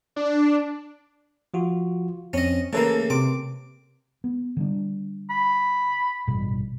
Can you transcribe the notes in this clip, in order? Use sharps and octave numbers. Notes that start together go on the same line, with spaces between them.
D4
F3 F4 F#4
F2 C4 C#4 D#5
C#3 E3 A3 A#3 A4 A#4
C3 D6
B3
D3 G3 D4
B5
A1 G2 B2